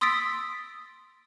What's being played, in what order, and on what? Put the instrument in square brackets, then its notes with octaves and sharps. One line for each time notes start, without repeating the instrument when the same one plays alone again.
[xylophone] C6 D#6 E6 A6 B6 D7